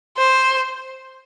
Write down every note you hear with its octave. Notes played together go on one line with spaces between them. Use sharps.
C5